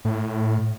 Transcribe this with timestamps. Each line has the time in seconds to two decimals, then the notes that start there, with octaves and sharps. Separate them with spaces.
0.05 A2